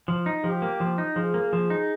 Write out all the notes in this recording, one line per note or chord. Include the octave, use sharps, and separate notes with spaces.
F3
D#4
F3 G4
A#3
F3
D#4
F3 G#4
A#3
F3
D#4